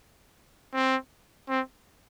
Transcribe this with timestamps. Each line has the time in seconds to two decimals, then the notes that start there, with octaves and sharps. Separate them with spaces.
0.73 C4
1.49 C4